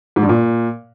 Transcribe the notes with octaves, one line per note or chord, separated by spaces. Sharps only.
G#2
G2
A#2